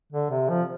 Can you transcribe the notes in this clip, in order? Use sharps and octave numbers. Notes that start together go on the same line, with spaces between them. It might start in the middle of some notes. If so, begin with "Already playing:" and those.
D3
C3
F3